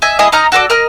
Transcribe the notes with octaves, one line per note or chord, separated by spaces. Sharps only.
D#5 E5 G#5
E4 G#4 D#5 D#6
D#4 D#5 A#5 F6
F#4 A4 C#5 D5
A#4 D#5 F6